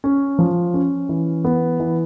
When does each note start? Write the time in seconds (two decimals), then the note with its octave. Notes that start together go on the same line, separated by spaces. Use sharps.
0.04 C#4
0.39 F3
0.74 C#4
1.09 E3
1.45 B3
1.80 E3